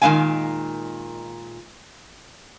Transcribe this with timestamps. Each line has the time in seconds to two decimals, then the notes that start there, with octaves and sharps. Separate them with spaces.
0.01 A#2 D#3 G#3 C#4 F5 G#5